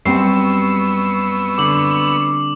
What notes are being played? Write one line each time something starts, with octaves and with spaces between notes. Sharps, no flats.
F#2 G3 B3 C4 C#6 E6 C7
D3 D6 F#7